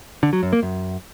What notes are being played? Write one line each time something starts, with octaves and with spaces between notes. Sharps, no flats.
D3
F#3
F#2
A#3
F#2